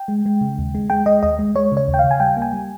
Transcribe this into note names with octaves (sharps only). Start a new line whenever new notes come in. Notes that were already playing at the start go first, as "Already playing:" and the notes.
Already playing: G5
G#3
G#3
C#3
D#2
G#3
G#3 G5
G#3 D#5
D#2 D#5
G#3
G#3 C#5
C#3 C#5
D#2
G5
C#3 F5
G#5
G3 G5
A#3
G#5
G3